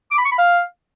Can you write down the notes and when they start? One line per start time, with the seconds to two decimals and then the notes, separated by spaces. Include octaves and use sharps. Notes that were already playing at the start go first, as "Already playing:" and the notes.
0.11 D6
0.18 B5
0.25 C#6
0.32 B5
0.38 F5